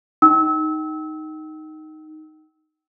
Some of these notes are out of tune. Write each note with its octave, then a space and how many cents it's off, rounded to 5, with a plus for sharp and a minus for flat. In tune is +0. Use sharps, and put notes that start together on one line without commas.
D#4 +0 G5 -30 E6 -30